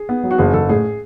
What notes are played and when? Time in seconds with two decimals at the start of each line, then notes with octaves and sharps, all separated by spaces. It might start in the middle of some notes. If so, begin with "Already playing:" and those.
Already playing: G#4
0.09 B3
0.23 F#3
0.31 F#4
0.38 F#1 G#4
0.54 F#1 A4
0.69 A2 G#4